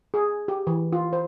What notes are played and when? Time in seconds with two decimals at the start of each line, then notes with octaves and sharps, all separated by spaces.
0.14 G#4
0.48 G4
0.67 E3
0.93 F4
1.13 C5